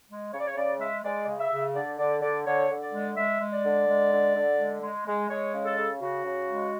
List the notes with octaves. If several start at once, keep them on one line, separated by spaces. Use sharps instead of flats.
G#3
C#3 C#5
D5
C#5
C#3 D5
G#3 E5
G#3 D5
C#3
E5
C#3
D3 D5
D3 D5
D3 D5
D3 C#5
D3
D5
G#3
G#3 E5
G#3
D5
D3
G#3
D3
D3
G#3
G#3
G#3
G#3 C#5
C#3
A4
C#3
C#3 F#4
C#3
G#3